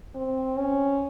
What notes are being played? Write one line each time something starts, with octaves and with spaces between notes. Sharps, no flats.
C4
C#4